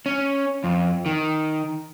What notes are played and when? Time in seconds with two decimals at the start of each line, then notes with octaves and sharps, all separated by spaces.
0.06 C#4
0.64 F2
1.06 D#3